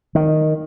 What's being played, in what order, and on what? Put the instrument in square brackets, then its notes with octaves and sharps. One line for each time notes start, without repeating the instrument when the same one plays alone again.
[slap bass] D#3